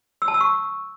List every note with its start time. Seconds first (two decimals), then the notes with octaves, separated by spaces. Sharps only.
0.22 E6
0.28 A5
0.34 E6
0.41 C#6